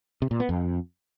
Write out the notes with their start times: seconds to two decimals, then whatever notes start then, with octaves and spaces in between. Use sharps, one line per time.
0.22 C3
0.31 A#2
0.40 B3
0.49 F2